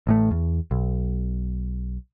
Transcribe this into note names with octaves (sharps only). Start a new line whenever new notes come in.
A1 A2 A3
E2
B1